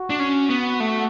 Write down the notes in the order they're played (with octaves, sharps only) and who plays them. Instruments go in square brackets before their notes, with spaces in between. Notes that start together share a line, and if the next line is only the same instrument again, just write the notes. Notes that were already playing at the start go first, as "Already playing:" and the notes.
Already playing: [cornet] F#4
[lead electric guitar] D4
C#4
B3
A3